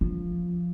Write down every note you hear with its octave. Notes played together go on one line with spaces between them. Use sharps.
F3